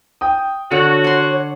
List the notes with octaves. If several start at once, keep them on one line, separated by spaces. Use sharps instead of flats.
G5 D#6
D3 F#4 C#5 C#7
D5 C6